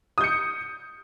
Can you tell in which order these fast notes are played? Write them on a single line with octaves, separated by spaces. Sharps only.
D#6 G6 C#7